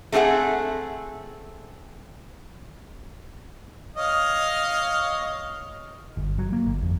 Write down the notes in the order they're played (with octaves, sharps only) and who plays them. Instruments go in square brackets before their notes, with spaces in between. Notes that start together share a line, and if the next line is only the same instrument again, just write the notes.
[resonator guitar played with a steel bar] A3 C4 G#4 D#5 F#5
[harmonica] C#5 D#5 F5
[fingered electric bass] G1
F#3
A#3
G1
F2